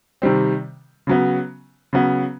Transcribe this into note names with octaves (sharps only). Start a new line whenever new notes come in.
C3 D#3 G3 C4
C#3 F#3 B3
C#3 F#3 B3